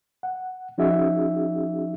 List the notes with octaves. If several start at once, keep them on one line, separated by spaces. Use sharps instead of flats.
F#5
F3 C#4 D#4 F#4 G#4 E5